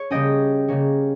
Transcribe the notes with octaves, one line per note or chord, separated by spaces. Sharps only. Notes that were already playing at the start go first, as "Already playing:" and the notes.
Already playing: C#5
C#3 G3 A#3 C#4 D#5 G5
C#3 G3 A#3 C#4